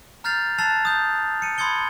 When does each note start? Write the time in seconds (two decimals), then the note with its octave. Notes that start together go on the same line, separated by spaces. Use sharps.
0.24 A#5 F6 G6 A6 C7 F7
0.58 A5 E6 F#6 A6 C7 F7
0.85 D#6 G6
1.42 C#7 D#7
1.58 B5 C6 D#6 G#6 C#7 G7